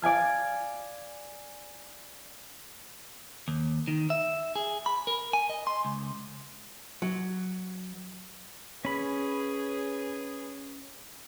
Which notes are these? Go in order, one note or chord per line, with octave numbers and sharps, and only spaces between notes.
D5 F5 G#5 F6
D#2
D#3
E5
G#4
B5
A#4
G#5
D#5
C6
C#2
F#3
C#4 G#4 B4 B5